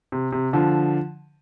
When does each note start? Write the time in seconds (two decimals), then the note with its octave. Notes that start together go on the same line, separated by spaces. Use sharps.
0.12 C3
0.32 C3
0.53 D3 F3